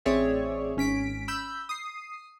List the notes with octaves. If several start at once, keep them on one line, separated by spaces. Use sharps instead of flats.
A1 C4 G#4 C#5 D5 E5
G#1 C#4 B6 D7
B5 E6 G6
D#6 C7